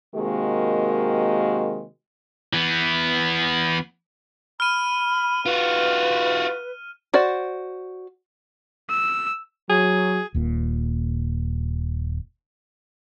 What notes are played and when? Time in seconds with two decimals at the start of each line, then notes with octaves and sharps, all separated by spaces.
0.15 C3 D#3 G#3 A#3 F#4
2.53 E3 B3
4.60 B5 F6 D#7
5.46 F4 F#4 B4
7.14 F#4 C5 D5
8.90 E6
9.69 F#3 G#4
10.35 D#1 A#2